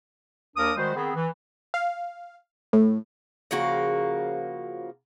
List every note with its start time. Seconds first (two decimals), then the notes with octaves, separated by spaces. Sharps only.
0.56 D#2 D4 A#4 D#6
0.77 D#3 G3 G#3 F#4 C5
0.95 D#3 B3 C4 G#4
1.15 E3
1.74 F5
2.73 A2
3.51 C#3 F3 A#3 F#4